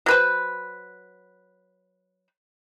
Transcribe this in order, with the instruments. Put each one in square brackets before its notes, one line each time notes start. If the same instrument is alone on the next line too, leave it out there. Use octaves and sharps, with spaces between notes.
[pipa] F#3 B4 C5